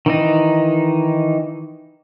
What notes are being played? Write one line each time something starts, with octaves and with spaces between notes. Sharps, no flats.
D#3 E3 D#4